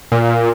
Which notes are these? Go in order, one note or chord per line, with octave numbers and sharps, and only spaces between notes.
A#2